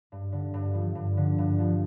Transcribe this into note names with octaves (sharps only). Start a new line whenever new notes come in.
G2
D3
G2
F3
G2
D3
G2
F3